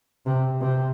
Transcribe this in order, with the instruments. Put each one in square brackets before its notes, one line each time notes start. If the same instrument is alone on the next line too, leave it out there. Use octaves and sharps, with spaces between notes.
[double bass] C3
C3